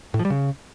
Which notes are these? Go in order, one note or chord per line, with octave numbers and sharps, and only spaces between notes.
A2
F3
G3
C#3